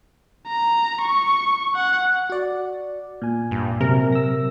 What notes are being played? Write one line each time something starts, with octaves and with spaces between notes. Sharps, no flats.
A#5
C#6
F#5
F#4 D5
A#2 G#5
G2
C3 F#3 A#4
E6 A#6